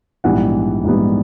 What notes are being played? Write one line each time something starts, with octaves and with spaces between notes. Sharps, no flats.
A#1 G#2 E3 G3 B3 F#5
A#1 G#2 E3 G3 B3